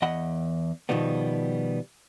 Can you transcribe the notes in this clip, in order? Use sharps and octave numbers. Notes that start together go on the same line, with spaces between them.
E2 D#5 F#5 B5
B2 D#3 F3 G3 B3